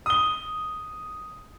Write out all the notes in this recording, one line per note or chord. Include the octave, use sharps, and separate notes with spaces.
D#6 G7